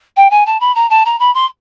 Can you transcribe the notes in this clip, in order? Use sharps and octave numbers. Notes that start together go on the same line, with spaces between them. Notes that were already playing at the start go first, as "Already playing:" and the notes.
G5
G#5
A5
B5
A#5
A5
A#5
B5
C6